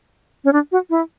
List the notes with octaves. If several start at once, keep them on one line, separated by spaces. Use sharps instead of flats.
C#4
D4
F#4
E4